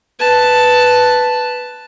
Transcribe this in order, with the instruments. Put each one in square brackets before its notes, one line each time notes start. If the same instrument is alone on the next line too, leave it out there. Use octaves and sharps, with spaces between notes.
[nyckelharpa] B4 A5